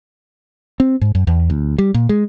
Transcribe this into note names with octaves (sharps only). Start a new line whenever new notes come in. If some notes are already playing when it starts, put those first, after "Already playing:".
C4
G#2
F#2
E2
D2
G3
A#2
G#3